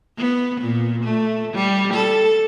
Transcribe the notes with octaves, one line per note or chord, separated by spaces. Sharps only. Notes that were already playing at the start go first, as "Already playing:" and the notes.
B3
A#2
A3
G3
A4